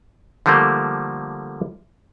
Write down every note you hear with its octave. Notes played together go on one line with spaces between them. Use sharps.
D3 F3 G3 A3 A#3